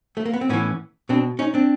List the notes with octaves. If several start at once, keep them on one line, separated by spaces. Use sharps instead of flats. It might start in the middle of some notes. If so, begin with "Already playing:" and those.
A3
A#3
B3
C4
A2 E3 B3 C#4
B2 C4 D4
C#4 D#4
C4 D4